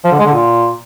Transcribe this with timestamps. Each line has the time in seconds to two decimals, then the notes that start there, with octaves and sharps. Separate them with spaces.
0.04 F3
0.11 D3
0.19 G#3
0.26 D3
0.33 A#2